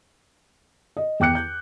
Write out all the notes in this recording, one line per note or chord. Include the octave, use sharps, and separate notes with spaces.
D#5
E2 G5 D6 F#6 C#7
G6